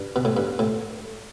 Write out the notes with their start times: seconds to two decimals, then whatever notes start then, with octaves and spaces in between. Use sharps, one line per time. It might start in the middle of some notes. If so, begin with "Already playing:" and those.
Already playing: G2
0.16 B2
0.25 A2
0.37 G2
0.59 A2